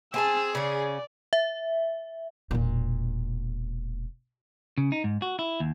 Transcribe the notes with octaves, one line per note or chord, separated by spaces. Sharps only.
C4 G#4 G#5 A5 E6
C#3 C#4 D5
E5
E1 A#2
C#3
D#4
G#2
F#4
E4
D#2